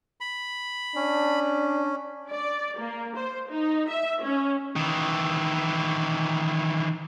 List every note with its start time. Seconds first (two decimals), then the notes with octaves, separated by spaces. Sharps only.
0.21 B5
0.96 C#4 D4
2.30 D5
2.78 A#3
3.16 C5
3.48 D#4
3.89 E5
4.22 C#4
4.76 D#3 E3